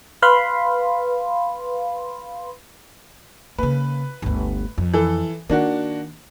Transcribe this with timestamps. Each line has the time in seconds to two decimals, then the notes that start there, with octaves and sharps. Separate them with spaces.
0.22 B4 F5 B5 C6
3.58 C#3 A#3 B4
4.22 G1 D2
4.78 F2
4.93 E3 A4
5.49 D#3 A#3 D4 F#4